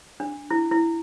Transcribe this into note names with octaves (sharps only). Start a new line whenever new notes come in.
D4
E4
E4